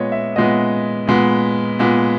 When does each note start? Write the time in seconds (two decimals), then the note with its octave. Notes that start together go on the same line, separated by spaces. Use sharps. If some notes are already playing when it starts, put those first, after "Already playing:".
Already playing: A#2 G#3 B3 C#5 D#5
0.12 E5
0.36 A#2 G#3 B3 D#5
1.07 A#2 G#3 B3
1.79 A#2 G#3 B3